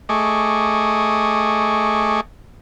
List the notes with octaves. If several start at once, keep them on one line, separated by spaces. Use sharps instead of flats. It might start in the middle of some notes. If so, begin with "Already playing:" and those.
A3 G#4 D#5 C#6 D6